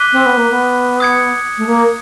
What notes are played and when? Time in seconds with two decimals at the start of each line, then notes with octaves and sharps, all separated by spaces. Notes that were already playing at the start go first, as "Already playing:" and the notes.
Already playing: D6 F#6 B6 D#7 G7
0.12 C4
0.25 B3
0.37 A#3
0.50 B3
1.00 D#6 G#6 C#7
1.57 A3
1.66 A#3